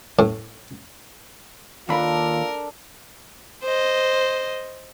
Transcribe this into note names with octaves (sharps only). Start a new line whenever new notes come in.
A2
D#2 D4 F4 A4 A#4 D5 B5
C5 D#5